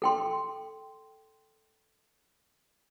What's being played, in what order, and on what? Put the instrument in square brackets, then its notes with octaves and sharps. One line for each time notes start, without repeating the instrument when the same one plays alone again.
[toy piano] A4 G5 C6